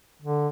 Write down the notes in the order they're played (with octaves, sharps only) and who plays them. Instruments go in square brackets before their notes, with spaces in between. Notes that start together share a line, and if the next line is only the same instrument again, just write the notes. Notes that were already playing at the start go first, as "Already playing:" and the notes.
[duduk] D3